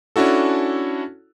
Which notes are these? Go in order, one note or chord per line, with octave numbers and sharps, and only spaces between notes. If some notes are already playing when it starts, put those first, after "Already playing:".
C#4 D4 E4 F#4 A4